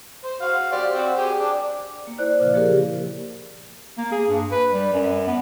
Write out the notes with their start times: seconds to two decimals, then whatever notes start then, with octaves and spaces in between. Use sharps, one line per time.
0.24 C5
0.41 F#4 F5
0.72 G4 C5 D5
0.94 C4 F#4
1.15 G4 G#4 G5
1.40 D4
2.07 A#3
2.18 E4 C5 D5 F#6
2.40 A#2 C#3 F3
2.54 F3 A#3 G4 G#4 A#4
3.98 A#3
4.12 G#4
4.28 G2
4.51 B4
4.72 G3
4.93 F#2
5.28 B3